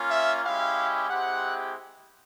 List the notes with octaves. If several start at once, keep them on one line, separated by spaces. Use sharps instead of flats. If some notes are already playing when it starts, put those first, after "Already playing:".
Already playing: A#3 C#4 F4
E5
G#3 C#4 E4 G4 F5
G#3 C4 E4 G4 F#5